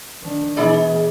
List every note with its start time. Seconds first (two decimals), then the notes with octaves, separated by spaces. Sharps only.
0.21 D#3 D4
0.56 B2 E3 D#4 G#4 D5